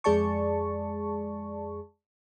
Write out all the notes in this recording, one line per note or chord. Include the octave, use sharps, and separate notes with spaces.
F2 G#3 G#4 D5 A5 C#6